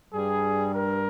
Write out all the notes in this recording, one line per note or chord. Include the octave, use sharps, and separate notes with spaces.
G2 G3 G#4
A#4